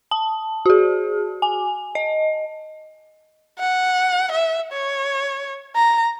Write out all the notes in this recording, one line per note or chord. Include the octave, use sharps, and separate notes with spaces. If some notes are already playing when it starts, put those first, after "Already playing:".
A5
F#4 G#4
G#5
D#5
F#5
E5
C#5
A#5